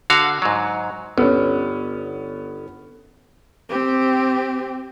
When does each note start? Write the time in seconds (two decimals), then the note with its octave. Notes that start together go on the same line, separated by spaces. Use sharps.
0.10 D3 F#4 F5
0.42 G#2 F#3
1.18 G1 B3 C#4
3.69 C4 G4